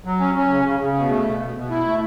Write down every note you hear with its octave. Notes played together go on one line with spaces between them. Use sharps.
F#3
C#4
C#4
C#3
C#3
C#3
B2
A3
B2
B2
B2
E4
A3